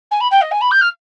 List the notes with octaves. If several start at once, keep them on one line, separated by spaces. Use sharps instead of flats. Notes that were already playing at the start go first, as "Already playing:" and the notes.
G#5
B5
G5
D#5
G#5
B5
G6
F6